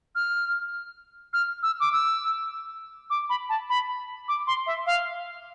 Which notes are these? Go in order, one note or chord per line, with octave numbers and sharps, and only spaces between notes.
F6
F6
E6
D6
E6
D6
B5
A5
B5
D6
C6
E5
F5